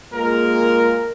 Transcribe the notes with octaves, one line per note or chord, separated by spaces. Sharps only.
G#3 A#3 F4 G#4 A#4